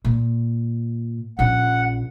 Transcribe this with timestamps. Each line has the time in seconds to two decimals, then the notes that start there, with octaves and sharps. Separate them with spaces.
0.05 A#2
1.39 A#1 C#4 F#5